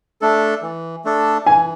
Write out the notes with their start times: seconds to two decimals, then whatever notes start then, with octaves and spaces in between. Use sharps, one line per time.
0.22 A3 D4 A4
0.62 E3
1.05 A3 D4 A4
1.46 E3 G#5